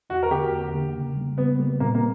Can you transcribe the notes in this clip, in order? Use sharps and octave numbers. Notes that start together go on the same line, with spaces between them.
E2 F#4
A#4
D3 A#3 G4
E2
D3 A#3
C#3
G3 A#3
C#3 B3
G3 A#3
A#2 A#3
A#3